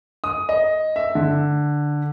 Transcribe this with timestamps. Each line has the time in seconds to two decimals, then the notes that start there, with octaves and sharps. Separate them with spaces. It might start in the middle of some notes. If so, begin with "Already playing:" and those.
0.24 D#6
0.49 D#5
0.96 E5
1.15 D3